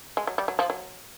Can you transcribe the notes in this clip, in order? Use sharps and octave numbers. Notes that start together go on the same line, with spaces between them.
G#3
F#3
G3
F#3
F3
F#3